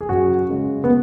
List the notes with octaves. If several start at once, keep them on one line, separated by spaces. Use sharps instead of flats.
G#4
F#2 F#4
C#3 G#3
B3